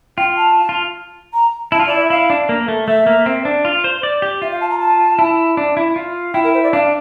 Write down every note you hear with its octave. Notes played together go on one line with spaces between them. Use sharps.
F4 G5
A5
F4
A#5
E4 A5
F4
E4 D5
E5
E4 F5
D4
A#3
A3
A3 E5
A#3
C4
D4
F4
C5
D5
G4
F4 E5
F5
A5
A#5
A5
E4
D4
E4
F4
E4 G5
A#4
C5
D5
D4 F5